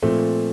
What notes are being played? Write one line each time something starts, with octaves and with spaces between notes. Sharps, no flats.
A#2 F3 A3 C4